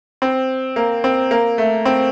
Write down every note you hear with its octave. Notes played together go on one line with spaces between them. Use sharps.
C4
A#3
C4
A#3
A3
C4